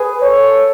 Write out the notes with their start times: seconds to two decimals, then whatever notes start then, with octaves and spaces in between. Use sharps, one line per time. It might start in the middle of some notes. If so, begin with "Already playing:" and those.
Already playing: G#4 B4
0.22 A4 C#5